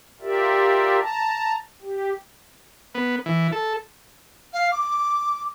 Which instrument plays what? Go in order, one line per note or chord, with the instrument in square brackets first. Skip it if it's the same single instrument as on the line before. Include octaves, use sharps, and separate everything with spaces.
[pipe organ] F4 G4 A#4 D5 E5
A5 A#5
G4
[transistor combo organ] B3
E3
A4
[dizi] F5
D6